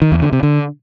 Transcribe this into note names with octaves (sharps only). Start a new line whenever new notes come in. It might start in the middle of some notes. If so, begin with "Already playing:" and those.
D#3
E2
D3
C3
D3